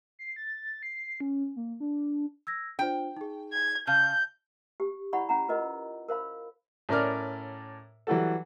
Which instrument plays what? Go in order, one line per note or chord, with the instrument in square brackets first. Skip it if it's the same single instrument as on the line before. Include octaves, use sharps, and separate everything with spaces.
[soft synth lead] C7
A6
C7
C#4
A#3
D4
[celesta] E6 G#6 A#6
[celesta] D4 F4 C5 [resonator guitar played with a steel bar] G5
[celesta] D#4 G#4
[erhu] G#6
[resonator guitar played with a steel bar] C#3 [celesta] F5 A5 F6 [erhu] G6
[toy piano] G4
E4 C#5 D5 F#5 B5 C#6
C#4 F#5 A#5
F4 A#4 B4 D#5
A#4 C5 F5 B5
[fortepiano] A2 C#4 A#4 D5 F6
E3 F#3 G3 F#4 A4